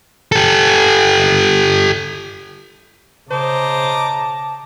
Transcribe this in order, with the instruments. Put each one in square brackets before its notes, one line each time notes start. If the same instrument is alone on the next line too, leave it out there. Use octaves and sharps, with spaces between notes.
[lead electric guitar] G4 A4
[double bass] C#3 [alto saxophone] C5 [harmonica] D#5 A#5 D6 [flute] A5